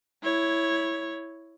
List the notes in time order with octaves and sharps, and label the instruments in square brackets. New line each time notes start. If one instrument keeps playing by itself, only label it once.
[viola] E4 C#5